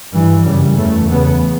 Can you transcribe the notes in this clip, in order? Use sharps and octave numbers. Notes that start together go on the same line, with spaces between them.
G2 E3
F#2 C#3 G3
E2 C#3 A3
E2 C#3 B3